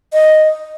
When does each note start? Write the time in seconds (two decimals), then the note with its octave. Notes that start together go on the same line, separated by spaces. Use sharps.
0.14 D#5